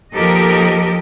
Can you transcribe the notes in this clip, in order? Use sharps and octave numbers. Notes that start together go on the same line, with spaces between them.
D#2 F3 G4 A4 A#4 D#5